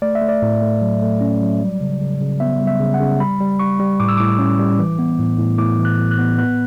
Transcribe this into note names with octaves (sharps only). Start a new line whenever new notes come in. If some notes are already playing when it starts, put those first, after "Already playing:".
A3 D5
E5
A3
D5
A2
A3
F#3
A3
C#4
F#3
G3
C#3
C#3
C#3
B3 E5
G3
E5
C#3
F#5
C#3
G3 B5
G3
G3 C#6
G3
A2 D6
E6
A2 D6
C#4
G3
E3
B3
A2
A2
A2 D6
E3
F#6
A2
F#6
B3
B3 F#6